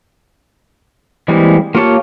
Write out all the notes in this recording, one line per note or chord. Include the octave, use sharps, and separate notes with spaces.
E3 G3 G#3 A#3 C4
A#3 F4 G4 C#5 A5